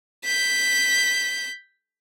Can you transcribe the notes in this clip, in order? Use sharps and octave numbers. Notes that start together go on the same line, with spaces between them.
G6 B6